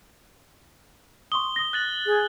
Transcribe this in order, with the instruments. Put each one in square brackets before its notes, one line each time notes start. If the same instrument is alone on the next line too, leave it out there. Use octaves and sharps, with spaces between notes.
[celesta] C6 C#6 D#6 [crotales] G7
[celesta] D#6 A#6
[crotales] F#6 A6 F#7
[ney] G#4